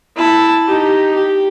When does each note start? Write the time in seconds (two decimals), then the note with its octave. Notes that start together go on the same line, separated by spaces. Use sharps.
0.16 E4 A5
0.67 D#4 G4
1.14 G4